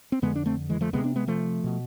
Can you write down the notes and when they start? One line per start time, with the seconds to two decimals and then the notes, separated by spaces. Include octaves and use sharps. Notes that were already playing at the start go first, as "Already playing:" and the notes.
0.12 C4
0.22 F2 D3 G#3 B3
0.35 D4
0.46 A3 C4
0.69 E3 G#3
0.81 F3 A3
0.93 D2 C3 G#3 B3
1.04 B3 D4
1.16 G#3 B3
1.28 F3 A3
1.64 B2